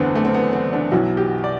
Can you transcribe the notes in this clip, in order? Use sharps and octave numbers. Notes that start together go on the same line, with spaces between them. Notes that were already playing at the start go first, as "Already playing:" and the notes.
Already playing: F#1 E2 D3 A3 B3 C4 D4
A3
C4
B3
C4
D4
B1 B2 F#3 E4
G4
D5